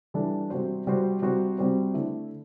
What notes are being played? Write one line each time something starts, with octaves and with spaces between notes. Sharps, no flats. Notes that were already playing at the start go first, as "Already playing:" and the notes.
E3 G3 D4 A4
C3 G3 C4 F#4 C5
C3 G3 C4 F#4 C5
C3 G3 C4 F#4 C5
C3 G3 C4 F#4 C5
D3 A3 E4